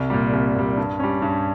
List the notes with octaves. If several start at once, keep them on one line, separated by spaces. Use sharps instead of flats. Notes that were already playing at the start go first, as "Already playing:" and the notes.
Already playing: C2
A#2 G3
C2
A#2 G3
G2
G3 C#4
G2